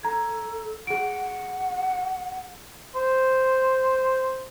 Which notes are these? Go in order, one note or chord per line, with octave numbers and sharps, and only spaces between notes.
A4 A#5 G#6
G#4 F#5 D7
C5